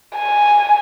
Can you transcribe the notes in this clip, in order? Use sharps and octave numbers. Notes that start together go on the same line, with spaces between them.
G#5